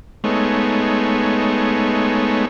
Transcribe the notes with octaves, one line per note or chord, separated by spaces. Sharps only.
G#3 A3 B3 D#4 C#5